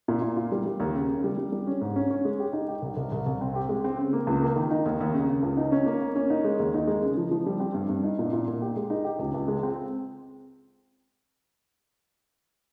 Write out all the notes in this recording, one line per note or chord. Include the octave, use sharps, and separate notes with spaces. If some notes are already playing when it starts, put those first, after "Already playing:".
A#2
A#2
F4
G3
G3
D#2
C#3
C#3
G3
G3
G3
C#4
G#2
C#4
C#4
G#3
G4
D#4
G4
C2
C2
C2
C2
C4
G4
G#3
C4
C#3
A#3
C#2
A#3
D#3
D#4
D#2
D#2
C#3
C#3
C#2
D#4
C#4
A#3
A#3
C#4
D#4
G#3
D#2
D#4
G#3
C#3
F3
F3
G3
C4
G2
G2
D#4
A#2
A#2
A#2
G4
G#3
D#4
G4
C#2
C#2
G#3
C4